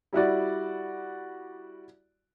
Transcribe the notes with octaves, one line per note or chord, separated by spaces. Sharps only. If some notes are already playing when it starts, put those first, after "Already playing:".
G3 E4 F#4 D5